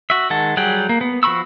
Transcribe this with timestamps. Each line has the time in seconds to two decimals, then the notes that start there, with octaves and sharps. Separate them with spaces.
0.10 F#4 E5
0.30 D#3 G#3 F#5 A5
0.57 F#3 G3 G#4 F#5 G5
0.89 A#3
1.01 B3
1.23 F3 F#4 B5 C#6 E6